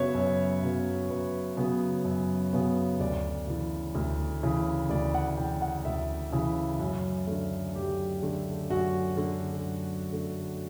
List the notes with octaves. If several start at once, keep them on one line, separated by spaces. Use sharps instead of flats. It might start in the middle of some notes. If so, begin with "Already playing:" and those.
Already playing: F#2 C#3 F#3 B3 C#5 E5
F#2
C#3 F#3 B3
F#2 B4
C#3 F#3 B3
F#2
C#3 F#3 B3
D2 D5
C#3 E3
D2
C#3 E3
D2 D5
F#5
C#3 E3 G5
F#5
D2 E5
C#3 E3
F#2
D3 A3
F#2 G4
D3 A3
F#2 F#4
D3 A3
F#2
D3 A3